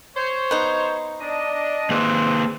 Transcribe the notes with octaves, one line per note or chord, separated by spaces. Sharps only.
C5 C#5
B3 D#4
D4 D#5
A#3 C4 G#4 B4